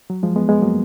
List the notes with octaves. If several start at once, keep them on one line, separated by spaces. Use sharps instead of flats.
F#3
F3 G#3
G#3 B3
G#3 B3
F#3 A#3